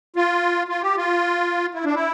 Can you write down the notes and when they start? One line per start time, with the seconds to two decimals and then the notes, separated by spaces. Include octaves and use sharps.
0.16 F4
0.68 F4
0.82 G4
0.97 F4
1.74 E4
1.85 D4
1.95 E4